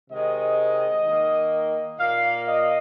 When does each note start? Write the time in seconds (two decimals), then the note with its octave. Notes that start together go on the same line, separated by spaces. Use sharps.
0.11 C3 D#3 G#3 D#5
1.05 D#3 A#3
1.99 A#2 A#3 F5
2.47 D#5